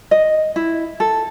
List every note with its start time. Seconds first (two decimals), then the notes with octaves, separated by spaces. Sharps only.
0.11 D#5
0.56 E4
1.00 A4